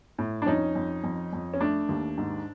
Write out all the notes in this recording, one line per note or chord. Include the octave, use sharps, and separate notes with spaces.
A2
D4
F2 C#4 D#4
F2
F2
F2
C#4
A3 D4
D#2
G#2